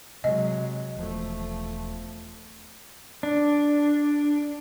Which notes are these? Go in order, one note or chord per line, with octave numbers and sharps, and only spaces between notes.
C3 F#3 G#3 D#5
E1 F3 A3
D4